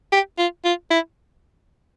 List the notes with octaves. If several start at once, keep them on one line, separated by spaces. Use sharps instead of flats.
G4
F4
F4
E4